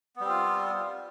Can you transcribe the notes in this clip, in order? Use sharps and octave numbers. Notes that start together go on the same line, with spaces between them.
G3 B3 C4 F4